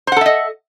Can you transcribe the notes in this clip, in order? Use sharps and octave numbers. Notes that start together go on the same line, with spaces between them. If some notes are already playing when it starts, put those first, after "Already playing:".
A4 C5 D#5 E5 F#5